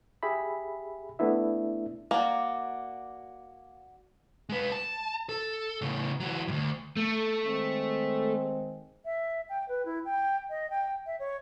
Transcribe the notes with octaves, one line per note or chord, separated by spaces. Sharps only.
G4 G#4 E5 B5
A3 B3 D4 E4 E5
A#3 F#4 D5
G#3 B4
A5
A4
A2 C#3
E3 F#3
D2 G2
A3
D#3 G#3 C4
E5
G5
B4
E4
G5
D#5
G5
E5
C#5